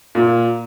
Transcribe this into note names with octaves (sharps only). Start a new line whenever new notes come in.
A#2